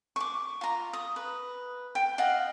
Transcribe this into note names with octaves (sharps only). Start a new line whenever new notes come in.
C#6 D6
F4 A#5
D#6
B4
G5
D#5 F5 F#5